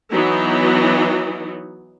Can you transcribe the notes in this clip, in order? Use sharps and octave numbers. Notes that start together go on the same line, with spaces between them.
E3 F#3 B3 D#4